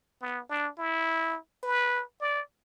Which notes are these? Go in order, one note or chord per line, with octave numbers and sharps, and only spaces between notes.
B3
D4
E4
B4
D5